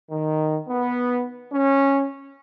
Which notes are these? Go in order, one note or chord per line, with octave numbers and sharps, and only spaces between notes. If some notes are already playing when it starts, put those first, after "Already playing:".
D#3
B3
C#4